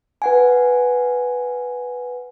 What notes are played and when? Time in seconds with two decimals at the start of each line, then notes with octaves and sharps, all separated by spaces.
0.22 B4 F#5 G#5